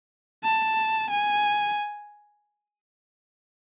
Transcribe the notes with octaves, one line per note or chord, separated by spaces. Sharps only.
A5
G#5